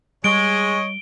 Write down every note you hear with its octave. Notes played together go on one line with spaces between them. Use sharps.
G3 G#3 C#5 D#5 D7 G7